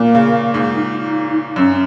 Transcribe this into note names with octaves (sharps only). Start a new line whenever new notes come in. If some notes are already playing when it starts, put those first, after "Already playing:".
Already playing: A#2 A#3
C#3
G#2
D#4
F#2 C#4